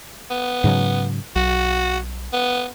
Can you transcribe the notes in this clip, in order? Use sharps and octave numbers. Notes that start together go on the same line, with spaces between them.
B3
G#2 C#3 F#3
B1 F#4
B3